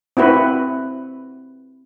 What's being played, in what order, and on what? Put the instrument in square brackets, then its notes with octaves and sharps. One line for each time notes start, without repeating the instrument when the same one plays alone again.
[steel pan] C4 E4 F#4 B4